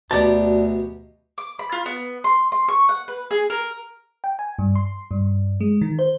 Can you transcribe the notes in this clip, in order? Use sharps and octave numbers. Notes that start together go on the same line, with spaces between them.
D2 B2 G4 D5 A5 A#5
D6
B5
F4
B3
C6
C6
C#6
F#5
B4
G#4
A#4
G5
G#5
G2
C6
G2
G#3
D#3
C5